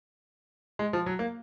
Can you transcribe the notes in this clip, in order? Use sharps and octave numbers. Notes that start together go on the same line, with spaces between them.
G#3
F3
F#3
A#3